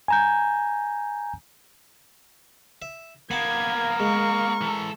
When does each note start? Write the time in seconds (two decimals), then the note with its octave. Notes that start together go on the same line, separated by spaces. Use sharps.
0.08 G#5 A#5 G6
2.82 E5
3.31 A#3 B3 A#4 F#5 A5 G#6
4.00 G#3 C#6
4.61 E3 A4